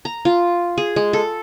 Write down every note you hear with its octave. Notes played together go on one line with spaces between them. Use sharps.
A#5
F4
G#4
G#3
A4